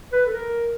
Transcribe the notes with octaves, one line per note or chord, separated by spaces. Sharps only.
B4
A4
A#4